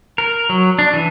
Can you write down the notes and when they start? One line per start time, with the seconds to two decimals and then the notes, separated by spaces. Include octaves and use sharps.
0.18 A#4
0.49 F#3
0.79 D4
0.94 E3